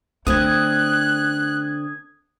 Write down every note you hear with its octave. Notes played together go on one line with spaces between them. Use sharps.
D3 A3 C4 D#6 F#6 G#6